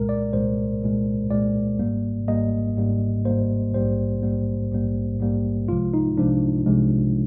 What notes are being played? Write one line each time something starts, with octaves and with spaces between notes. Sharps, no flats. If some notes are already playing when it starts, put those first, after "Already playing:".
Already playing: C2 A#2 G#3 A#4
D5
C2 A#2 G#3 C5
C2 A#2 G#3
C2 A#2 G#3 D5
G#1 G#2 G3 A#3
G#1 G#2 G3 A#3 D#5
G#1 G#2 G3 A#3
G#1 G#2 G3 A#3 C5
A#1 G#2 G3 A#3 C5
A#1 G#2 G3 A#3
A#1 G#2 G3 A#3
A#1 G#2 G3 A#3
C2 C3 F3 G#3 F4
D#4
C2 C3 F3 G#3 D4
C2 C3 F3 G#3